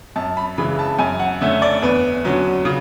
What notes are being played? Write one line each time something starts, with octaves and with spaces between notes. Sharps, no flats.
F#2 A5
B5
C#3 E3 G#3 B5
A5
F#2 G#5
F#5
D3 A3 C#4 E5
D5
E2 B4
D3 F#3 C#4
C#3